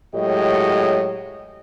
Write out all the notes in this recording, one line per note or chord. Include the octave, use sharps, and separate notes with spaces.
A2 F#3 G#3 G4 C#5 D#5